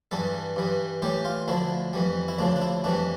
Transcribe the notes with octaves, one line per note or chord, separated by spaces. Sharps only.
G2 E3 G3 A4
G2 E3 G3
A2 E3 G3 G4
F4
D2 D3 F3 E4
F2 E3 G3
E4
D2 C#3 F3 D4
D4
E4
F2 E3 G3 D4